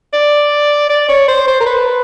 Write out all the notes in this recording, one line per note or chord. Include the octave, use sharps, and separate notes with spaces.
D5
D5
C#5
C5
C5
A#4
B4